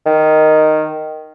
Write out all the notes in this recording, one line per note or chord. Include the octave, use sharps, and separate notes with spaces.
D#3